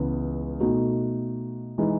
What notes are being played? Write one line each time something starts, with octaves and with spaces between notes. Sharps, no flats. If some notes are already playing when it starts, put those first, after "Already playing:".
Already playing: C#2 C#3 E3 B3
B2 A3 D#4 F#4
E3 G#3 D#4